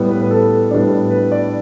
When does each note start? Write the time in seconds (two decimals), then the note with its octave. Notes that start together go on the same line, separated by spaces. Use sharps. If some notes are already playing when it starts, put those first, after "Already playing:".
Already playing: A2 G3 B3
0.11 B4
0.21 B4
0.31 A4
0.71 A2 G3 B3 D4
1.11 B4
1.32 D5